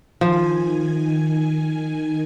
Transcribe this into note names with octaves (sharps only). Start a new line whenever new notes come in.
D#3 F3 G#5